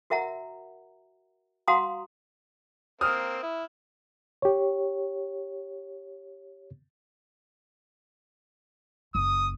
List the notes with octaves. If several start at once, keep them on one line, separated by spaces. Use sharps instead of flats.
F#4 A#4 E5 F#5 A#5
F#4 F5 F#5 A#5 C6 D#6
A#3 C4 D#6 F6
E4
G4 C#5
F#1 D#6